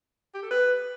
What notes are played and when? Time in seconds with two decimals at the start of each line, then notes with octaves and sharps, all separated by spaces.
0.34 G4
0.42 A4
0.51 B4